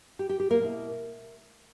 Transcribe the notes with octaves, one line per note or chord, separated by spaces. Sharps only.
G4
G4
G4
A#3 A#4
B2 A#3 E4